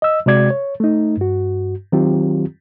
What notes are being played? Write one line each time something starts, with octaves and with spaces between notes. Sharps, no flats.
D#5 E6
C3 G#3 F#4 D5 G#6
C#5
A3 D#4
G2 F#4
D#3 F#3 C4 F4 G4